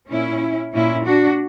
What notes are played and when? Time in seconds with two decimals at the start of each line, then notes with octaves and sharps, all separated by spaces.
0.10 A#2 C#4 E4
0.73 A#2 C#4 E4
1.05 D4 F#4